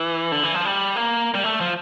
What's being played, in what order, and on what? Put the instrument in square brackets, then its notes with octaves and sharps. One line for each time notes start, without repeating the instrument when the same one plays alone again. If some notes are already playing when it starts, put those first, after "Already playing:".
Already playing: [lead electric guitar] E3
D3
E3
F3
G3
A#3
G3
A3
F3